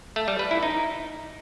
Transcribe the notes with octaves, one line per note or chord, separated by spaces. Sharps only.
A3
G3
B4
E4
D#4